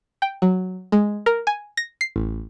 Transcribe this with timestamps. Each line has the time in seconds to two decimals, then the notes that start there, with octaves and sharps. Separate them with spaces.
0.22 G5
0.42 F#3
0.92 G#3
1.26 A#4
1.47 G#5
1.77 A#6
2.01 C7
2.16 A1